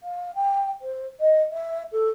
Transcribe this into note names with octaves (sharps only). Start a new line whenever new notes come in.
F5
G5
C5
D#5
E5
A4